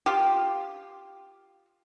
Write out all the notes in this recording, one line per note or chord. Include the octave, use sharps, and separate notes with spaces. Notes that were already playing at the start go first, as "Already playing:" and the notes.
F4 G4